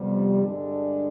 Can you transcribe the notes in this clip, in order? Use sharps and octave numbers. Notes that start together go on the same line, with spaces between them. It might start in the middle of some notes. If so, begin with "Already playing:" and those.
Already playing: F2 C3 G3 B3
G2 D3 G#3 D4